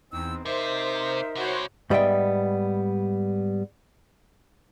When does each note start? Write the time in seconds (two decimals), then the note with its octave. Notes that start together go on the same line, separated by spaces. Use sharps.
0.12 E2 C4 D#4 E6
0.46 C3 D#4 A#4 C5 E5
1.36 C3 E4 F#4 C5 C#5
1.90 G#2 G3 B3 D#5 E5 G5